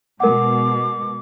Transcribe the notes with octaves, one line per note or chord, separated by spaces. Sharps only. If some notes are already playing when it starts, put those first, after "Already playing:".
B2 G#3 A#4 F#5 D6